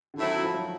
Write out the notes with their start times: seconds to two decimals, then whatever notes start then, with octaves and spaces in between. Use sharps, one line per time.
0.14 D3
0.18 A2 D#3 F#3 A3 C4 E4
0.43 F3
0.54 F#3